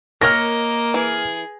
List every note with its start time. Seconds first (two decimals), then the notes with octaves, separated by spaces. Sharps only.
0.21 A#3 A#4 C#5 D#5 F6 A#6
0.94 E3 G#4